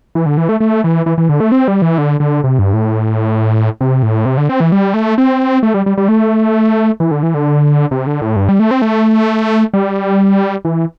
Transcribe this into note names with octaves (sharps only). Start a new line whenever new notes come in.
E3
D3
E3
A3
A3
E3
E3
E3
D3
A3
C4
G3
E3
D3
D3
C3
G2
A2
C3
A2
C3
D3
C4
E3
G3
A3
C4
A3
G3
G3
G3
A3
E3
D3
E3
D3
C3
D3
A2
G2
G3
A3
C4
A3
G3
E3